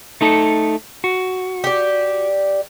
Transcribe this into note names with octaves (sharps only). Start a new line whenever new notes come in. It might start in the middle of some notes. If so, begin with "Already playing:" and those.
A3 D#4 A4
F#4
G4 D5